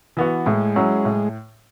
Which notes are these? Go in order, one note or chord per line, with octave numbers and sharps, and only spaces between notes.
E3 B3 F#4
A2 G#3
F#3 C#4 E4
A2